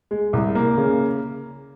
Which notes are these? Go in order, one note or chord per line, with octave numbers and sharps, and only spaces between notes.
G#3
C2
A#3
C#3